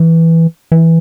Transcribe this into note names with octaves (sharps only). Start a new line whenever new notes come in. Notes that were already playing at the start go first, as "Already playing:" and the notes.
Already playing: E3
E3